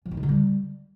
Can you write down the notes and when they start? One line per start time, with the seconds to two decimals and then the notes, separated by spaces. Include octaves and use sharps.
0.06 F3
0.11 D#4
0.17 D#3
0.23 D3
0.29 G3